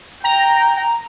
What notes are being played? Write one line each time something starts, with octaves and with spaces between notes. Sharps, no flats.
G5 A#5